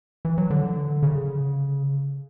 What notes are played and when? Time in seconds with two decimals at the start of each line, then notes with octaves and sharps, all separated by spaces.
0.25 E3
0.38 F#3
0.50 D3
1.03 C#3